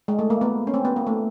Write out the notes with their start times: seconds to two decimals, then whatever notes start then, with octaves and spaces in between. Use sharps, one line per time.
0.08 G#3
0.19 A3
0.30 A#3
0.41 B3
0.67 C#4
0.74 C4
0.85 B3
0.96 A#3
1.07 A3